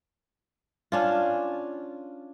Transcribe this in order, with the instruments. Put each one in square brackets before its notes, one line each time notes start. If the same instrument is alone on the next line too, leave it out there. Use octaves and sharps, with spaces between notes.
[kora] C#4 D4 F4